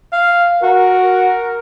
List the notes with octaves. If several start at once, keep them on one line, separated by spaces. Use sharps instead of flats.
F5
F#4 A#4